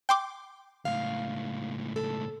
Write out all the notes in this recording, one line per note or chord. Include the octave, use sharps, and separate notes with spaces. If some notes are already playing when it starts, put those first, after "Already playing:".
G5 C6 D6
C#2 A2 F5
A4